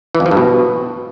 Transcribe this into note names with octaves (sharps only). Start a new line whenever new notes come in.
E3
F2
F3
G2
B2